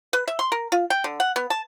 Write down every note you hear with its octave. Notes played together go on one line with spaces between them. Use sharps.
B4
E5
C6
A#4
F4
G5
D3
F#5
B3
A5